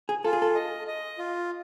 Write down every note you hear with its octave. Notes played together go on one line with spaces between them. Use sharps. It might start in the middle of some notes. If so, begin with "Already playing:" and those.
G#4
F4 A4
G#4
A4
D#5
D#5
F4